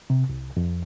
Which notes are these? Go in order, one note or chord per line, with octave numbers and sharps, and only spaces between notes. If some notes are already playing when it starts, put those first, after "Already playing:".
C3
C2
F2